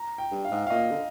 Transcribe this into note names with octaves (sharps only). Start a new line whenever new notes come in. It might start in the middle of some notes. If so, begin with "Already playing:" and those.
Already playing: A#5
G5
G2
F5
G#2
F5
A#2 D#5
D3